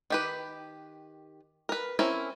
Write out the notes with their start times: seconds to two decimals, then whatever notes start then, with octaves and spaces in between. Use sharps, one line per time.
0.10 D#3 G4 B4
1.69 A#4 B4
1.99 C4 C#4 E4 A#4